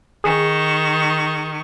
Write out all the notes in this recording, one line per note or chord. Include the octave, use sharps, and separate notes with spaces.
D#3 G#4 C#6